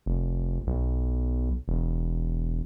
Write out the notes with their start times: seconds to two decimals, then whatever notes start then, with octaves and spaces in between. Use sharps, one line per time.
0.06 F1
0.67 B1
1.68 E1